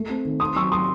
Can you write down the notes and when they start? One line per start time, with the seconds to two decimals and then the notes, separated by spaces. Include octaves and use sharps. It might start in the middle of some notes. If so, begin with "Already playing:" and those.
Already playing: A3
0.09 C4
0.25 D#3
0.40 C4 C6 D#6
0.56 F#3 C#6 E6
0.72 F#3 C6 D#6